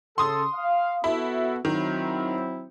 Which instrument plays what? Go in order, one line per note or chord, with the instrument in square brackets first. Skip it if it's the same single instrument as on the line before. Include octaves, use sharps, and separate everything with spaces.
[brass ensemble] C#3 A4 [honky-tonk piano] C6 D#6
[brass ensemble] F5
[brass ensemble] B3 F#4 A4 [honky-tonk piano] E4
[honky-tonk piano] D#3 [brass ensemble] F#3 C4 E4